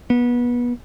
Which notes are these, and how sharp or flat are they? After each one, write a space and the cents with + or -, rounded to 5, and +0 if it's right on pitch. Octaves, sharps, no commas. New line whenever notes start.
B3 -25